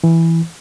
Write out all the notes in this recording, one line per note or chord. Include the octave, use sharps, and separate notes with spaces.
E3